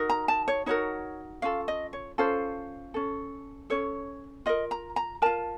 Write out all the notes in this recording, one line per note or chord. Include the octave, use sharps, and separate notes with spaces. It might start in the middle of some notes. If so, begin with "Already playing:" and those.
Already playing: D#4 F#4 A#4
A#5
A5
C#5
D#4 F#4 A#4 C#5
C#4 F4 A4 F5
D#5
C#5
C#4 F4 A4 C5
C#4 A4
C#4 A4 C#5
F4 A#4 D#5
A#5
A#5
F4 A#4 A5